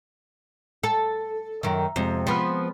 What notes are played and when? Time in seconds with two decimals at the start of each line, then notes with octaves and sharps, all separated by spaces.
0.83 A4
1.63 F#2 D#3 E5 A#5
1.96 F2 C3 G#3
2.27 F3 B3 C5 B5 F6